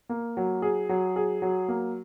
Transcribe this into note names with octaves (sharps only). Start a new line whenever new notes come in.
A#3
F#3
G#4
F#3
G#4
F#3
A#3